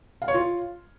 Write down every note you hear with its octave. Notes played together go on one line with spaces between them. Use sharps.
F5
C#5
F4